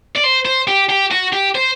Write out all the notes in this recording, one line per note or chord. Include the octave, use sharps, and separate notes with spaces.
D5
C5
C5
G4
G4
F#4
G4
C5